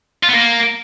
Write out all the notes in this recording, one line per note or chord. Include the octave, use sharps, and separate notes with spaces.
F4
B3
A#3